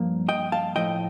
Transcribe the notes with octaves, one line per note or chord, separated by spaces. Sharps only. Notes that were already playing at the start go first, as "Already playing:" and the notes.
Already playing: G2 F3 A#3
D#5 G5
F5 A5
A2 F3 A3 D#5 G5